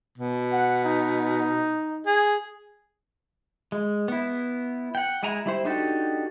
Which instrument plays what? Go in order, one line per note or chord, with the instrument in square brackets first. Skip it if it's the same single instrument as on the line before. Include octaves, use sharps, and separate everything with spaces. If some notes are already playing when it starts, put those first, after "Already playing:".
[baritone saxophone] B2
[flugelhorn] F#5
D#4
[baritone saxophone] G#4
[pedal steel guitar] G#3
B3 E4
F#5 G5
G#3 E4 G#5 A#5
G3 E4 C5
D4 D#4 F#4 G4 A4